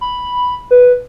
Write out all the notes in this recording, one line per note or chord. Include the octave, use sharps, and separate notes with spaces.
B5
B4